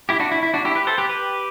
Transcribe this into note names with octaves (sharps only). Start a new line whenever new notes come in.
E4 G4
D4 F#4
E4
E4
D4 F#4
E4 G4
G4 B4
A4 C5
G4 B4
G4 B4